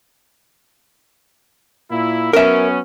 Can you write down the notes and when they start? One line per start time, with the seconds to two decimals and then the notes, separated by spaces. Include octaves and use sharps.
1.91 A#2 A#3 E4
2.33 F#3 B3 C#4 A#4 E5